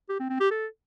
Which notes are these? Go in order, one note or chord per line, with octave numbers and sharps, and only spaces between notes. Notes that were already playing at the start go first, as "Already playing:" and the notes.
G4
C4
C4
G4
A4